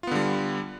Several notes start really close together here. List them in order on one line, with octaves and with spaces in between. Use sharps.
F4 B3 D3 G3